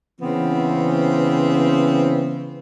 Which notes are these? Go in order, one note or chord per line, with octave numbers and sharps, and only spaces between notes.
C#3 E3 B3 C4